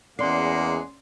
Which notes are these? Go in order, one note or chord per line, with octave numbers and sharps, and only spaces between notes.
E2 G#3 A#3 C#4 D5 F#5 C6 C7